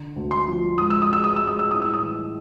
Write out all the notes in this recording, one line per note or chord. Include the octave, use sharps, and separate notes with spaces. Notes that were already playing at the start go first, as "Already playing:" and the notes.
Already playing: D3
D2
C6
F3
G#2 D#6
E6
D#6
G#3 E6
D#6
G#3 E6
D#6
E6
A2 D#6
E6
D#6
E3